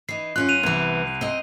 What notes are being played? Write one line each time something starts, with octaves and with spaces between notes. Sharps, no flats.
E3 D#4 C7
F#2 C#4 F4 F#6
D#7 F7
C2 E3 B3
C4 D#5